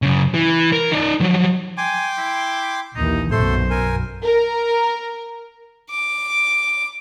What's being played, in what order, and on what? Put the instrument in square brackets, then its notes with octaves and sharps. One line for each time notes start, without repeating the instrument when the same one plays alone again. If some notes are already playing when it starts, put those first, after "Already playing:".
[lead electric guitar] F#2 C#3
E3
A#4
D#4 D5
F3 F#3
[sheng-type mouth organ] G5 C6 D6 [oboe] G#5
[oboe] E4
[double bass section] A#1 D#2 E3 [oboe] D#4
[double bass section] B1 F#2 B2 [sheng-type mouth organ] A3 A4 C6 [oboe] C5
[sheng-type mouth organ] A#4 G#5
[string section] A#4
[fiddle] D6